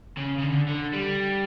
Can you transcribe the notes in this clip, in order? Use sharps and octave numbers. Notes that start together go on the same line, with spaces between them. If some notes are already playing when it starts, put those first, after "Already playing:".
C#3
C#3
D3
D3
G3